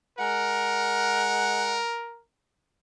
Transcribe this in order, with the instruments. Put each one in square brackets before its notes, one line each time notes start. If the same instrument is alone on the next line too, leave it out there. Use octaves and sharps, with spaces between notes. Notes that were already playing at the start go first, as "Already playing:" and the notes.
[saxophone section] G#3 F#5 [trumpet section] A#4